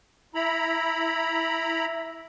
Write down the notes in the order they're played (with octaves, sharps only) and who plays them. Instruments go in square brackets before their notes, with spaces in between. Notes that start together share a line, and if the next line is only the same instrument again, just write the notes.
[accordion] E4 A#5 B5